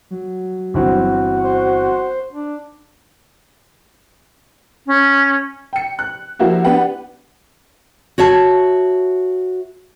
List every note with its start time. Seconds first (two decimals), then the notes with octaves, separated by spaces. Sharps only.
0.11 F#3
0.74 G1 E3 C4 F#4
1.44 C5
2.31 D4
4.87 C#4
5.73 G5 C#7
5.99 F#6
6.39 F3 A#3 E4 F#4 G4
6.65 B3 D4 G4 B4 F#5
8.18 F#4 C#5 E5 A5